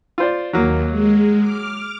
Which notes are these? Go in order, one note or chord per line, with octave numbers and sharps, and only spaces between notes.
F4 C5 D5
D#2 F#3 A#3
G#3
D6 F6